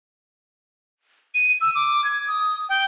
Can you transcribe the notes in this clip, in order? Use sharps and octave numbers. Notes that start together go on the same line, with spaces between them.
D#7
E6
D6
G#6
D#6
G5